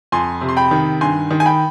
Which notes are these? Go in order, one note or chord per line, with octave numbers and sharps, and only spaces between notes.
F2 G#5 C6
C3
C6
G5 B5
D#3
G2 G#5 C6
D#3
G#5
G5 B5